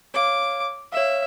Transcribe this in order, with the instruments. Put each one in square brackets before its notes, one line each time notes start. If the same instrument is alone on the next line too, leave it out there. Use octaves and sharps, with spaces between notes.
[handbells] C#5 F5 [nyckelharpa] D6
[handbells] C#5 F5 [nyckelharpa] E5